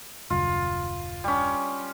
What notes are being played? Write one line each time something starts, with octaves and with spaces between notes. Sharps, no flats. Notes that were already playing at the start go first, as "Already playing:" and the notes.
D#1 F#2 C#3 F4
G3 C#4